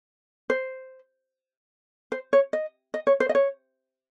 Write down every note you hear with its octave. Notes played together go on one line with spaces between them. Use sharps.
C5
C5
C#5
D#5
D#5
C#5
C5
D#5
C#5